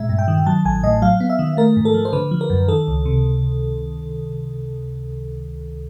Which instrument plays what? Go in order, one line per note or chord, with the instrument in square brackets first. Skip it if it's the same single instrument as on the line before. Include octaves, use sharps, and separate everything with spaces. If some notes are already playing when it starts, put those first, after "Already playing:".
Already playing: [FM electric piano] A#2 G#3 E5
G2
G5
D#3
F#3 A5
A1 G#5
A2 D#5
F#3 F5
B3
E5
D#3
A3 A#4
G#2
A4
F3
C5
D3 B4
F3
A#4
F#2
D#3 A4
C#2
C3